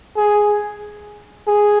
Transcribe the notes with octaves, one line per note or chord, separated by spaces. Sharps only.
G#4
G#4